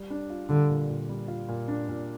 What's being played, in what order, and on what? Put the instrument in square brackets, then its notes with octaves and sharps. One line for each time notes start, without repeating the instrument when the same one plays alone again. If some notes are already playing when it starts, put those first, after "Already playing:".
Already playing: [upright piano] G3
D4
F4
[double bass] D3 [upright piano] G3
[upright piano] A#2
A#2
G3
F4
A#2
D4
A#2